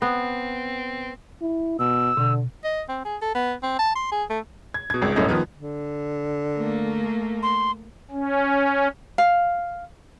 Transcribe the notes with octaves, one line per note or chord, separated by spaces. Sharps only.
B3 C4
E4
B2 E6
B2 D3
D#5
C4
G#4
A4
B3
C4
A5
C6
G#4
A3
G#6
B2 G#6
G#1 C#2
D#1 F#2 A2 C#4 D#5
D#3 F3 B3
D3
A3 A#3
C6
C#4
F5